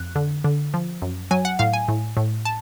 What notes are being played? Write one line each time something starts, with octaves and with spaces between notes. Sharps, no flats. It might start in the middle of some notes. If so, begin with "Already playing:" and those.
Already playing: F2 F#6
D3
D3
F3
F#2
F#3 G#5
F#5
A2 F5
G#5
A2
A2
A5